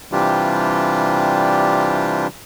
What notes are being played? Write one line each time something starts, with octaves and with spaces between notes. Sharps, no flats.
C3 E3 G3 D4 F4 G4